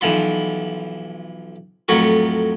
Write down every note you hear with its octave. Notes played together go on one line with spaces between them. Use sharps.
B1 E3 F3 C6
F2 A2 F#3 A#4 C#6